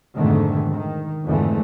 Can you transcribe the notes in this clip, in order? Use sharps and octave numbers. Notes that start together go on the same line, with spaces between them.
F2 G#2 B2 D3 D#3 A3
D#3
F2 G#2 D3 E3 A3